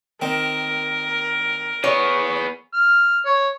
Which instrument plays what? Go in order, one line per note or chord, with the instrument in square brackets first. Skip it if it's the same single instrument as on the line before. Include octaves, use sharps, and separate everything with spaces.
[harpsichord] D#3 C4 [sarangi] A#4
[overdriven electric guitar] B3 G#4 [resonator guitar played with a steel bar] C#5
[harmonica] F6
C#5